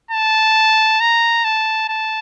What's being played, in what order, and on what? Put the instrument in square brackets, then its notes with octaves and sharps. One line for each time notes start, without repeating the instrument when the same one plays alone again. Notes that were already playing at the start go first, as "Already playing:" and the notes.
[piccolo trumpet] A5
A#5
A5
A5